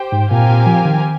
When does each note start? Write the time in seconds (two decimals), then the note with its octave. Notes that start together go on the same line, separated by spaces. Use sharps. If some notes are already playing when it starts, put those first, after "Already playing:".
Already playing: G4 C5 G5
0.12 G#2
0.30 A#2 C4 G4 A#4 F5 G#5
0.49 A#2
0.66 F3
0.85 D#3